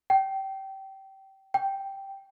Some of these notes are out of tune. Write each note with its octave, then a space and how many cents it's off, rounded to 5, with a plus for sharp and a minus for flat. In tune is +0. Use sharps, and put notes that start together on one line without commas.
G5 -25
G5 -5